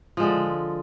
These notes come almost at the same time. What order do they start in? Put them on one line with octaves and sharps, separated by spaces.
F3 G#3 D3